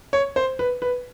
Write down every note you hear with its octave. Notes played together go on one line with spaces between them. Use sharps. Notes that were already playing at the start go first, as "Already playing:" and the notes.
C#5
C5
B4
B4